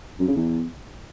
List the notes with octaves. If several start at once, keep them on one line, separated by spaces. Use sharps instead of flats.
F#2
C#3
E2